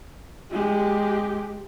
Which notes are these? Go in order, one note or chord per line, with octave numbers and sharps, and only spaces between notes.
G#3 G4